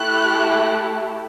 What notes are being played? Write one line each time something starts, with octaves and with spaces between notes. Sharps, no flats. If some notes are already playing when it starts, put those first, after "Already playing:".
Already playing: A3 E4 G4 F#6